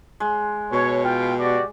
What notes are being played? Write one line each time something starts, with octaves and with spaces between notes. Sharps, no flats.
G#3
B2 C#5
F4 G5
F#4 G4 D5